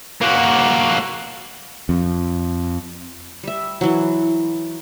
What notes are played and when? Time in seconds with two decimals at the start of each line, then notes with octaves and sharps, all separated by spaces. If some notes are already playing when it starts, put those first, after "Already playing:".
0.21 A#3 F#4
1.89 F2
3.43 G3 E5
3.81 E3 F#3